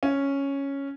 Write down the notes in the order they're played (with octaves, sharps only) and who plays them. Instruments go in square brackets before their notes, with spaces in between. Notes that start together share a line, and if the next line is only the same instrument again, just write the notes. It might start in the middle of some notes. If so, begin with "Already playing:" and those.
[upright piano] C#4